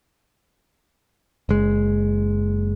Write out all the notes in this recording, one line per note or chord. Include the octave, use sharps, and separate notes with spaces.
F#1 G#3